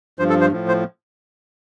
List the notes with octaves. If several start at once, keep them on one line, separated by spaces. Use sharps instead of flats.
G2 F3 C5
A4
C5
A2 F3
C5